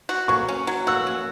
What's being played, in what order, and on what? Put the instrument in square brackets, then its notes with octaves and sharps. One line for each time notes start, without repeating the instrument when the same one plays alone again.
[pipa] F#4
[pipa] F#3 [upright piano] C#6
[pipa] C#4
F#3
[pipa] F#4 [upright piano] E6
[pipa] F#3